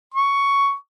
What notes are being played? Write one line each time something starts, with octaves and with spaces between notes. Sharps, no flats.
C#6